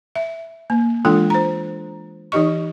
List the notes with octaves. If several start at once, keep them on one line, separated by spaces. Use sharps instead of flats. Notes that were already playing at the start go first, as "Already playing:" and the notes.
E5
A#3
E3 G#3 D4 F4 A4 G5
C5 A#5
E3 D#4 G4 D#5 C#6